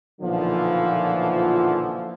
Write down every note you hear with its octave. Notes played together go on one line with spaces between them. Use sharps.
B1 A#2 D3 E3 F3